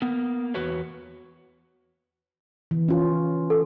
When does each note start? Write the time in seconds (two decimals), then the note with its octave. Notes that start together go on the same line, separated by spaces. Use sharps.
0.02 A#3 B3
0.54 E2 F#4 B4 C#5
2.71 E3
2.88 C#4 F4
3.50 A4